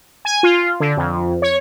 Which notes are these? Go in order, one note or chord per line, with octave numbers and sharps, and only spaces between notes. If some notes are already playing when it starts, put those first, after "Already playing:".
G#5
F4
D3
F2
C#5